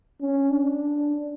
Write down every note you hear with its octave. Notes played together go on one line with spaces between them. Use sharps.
C#4
D4